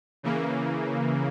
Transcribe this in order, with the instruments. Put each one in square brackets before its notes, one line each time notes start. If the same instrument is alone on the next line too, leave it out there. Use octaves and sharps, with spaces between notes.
[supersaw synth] C#3 E3 A#3